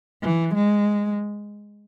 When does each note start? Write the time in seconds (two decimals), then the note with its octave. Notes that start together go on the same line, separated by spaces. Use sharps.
0.23 E3
0.54 G#3